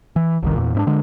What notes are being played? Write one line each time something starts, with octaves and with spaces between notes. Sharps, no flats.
E3
G1 C2 D#3
E2 A#2
G#2 C4 D4
D3 G#3